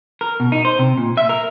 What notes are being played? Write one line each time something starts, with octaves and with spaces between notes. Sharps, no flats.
A#4
B2
D#4
C5
C3
A#2
E5
A#4